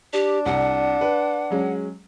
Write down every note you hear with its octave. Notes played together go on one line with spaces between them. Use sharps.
D4 G4
C2 F#5
B4
F#3 G#3 C#4